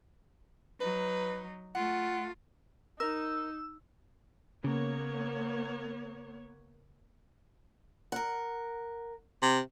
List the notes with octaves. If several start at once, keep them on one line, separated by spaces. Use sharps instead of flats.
F#3 D#4 B4
A3 F4 F#5
D#4 A#4 E6
C#3 A#3 B3 C#5
A#4 F#5
C3